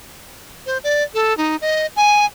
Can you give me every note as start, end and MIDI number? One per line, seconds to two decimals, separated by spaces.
0.66 0.78 72
0.84 1.03 74
1.14 1.36 69
1.37 1.56 63
1.61 1.86 75
1.96 2.25 80